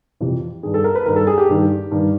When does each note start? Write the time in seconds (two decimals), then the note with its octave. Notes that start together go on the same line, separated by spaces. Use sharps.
0.20 F2 C3 E3
0.63 G2 D#3 G#4
0.74 A4
0.84 A#4
0.95 B4
1.06 G2 D#3 A#4
1.16 A4
1.27 G#4
1.38 G4
1.49 G2 D#3
1.91 G2 D#3